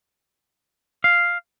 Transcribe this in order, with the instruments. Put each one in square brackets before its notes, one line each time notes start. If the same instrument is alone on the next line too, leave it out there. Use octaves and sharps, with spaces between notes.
[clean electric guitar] F5